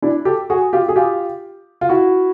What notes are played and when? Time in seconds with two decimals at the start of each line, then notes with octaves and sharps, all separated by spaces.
0.02 D4 E4
0.25 G4 A4
0.50 F#4 G#4
0.73 F4 G4
0.89 G#4
0.96 F4 G4
1.81 F4
1.89 E4 F#4